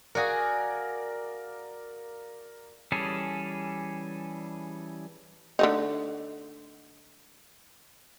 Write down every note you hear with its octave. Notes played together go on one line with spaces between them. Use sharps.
F#4 G#4 A#4 D5 F5
E3 G3 C#4 G#4 A4
D3 A3 D#4